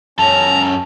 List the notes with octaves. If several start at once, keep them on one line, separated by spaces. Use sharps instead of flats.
F#2 C#4 A4 A5 A#5